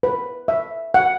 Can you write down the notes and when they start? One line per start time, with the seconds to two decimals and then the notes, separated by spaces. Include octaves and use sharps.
0.03 B4
0.48 E5
0.94 F#5